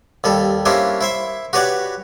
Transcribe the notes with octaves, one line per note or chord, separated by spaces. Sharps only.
D#2 G3 A4
A#3 C#4 D4 E4 G4 C5
E4 C5 E5
F#4 G4 B4 C#5 D5 F#5